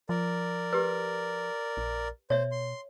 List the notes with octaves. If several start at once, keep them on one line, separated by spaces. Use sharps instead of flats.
F3 A#4 D5
G4 B4
A#1
B2 C5 C#5 E5
C6